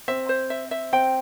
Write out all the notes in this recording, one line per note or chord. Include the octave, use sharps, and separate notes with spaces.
C4 E5
C5
E5
E5
C4 G5